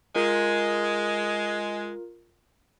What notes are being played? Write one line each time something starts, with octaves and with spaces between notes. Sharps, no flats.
G#3 F4 A#4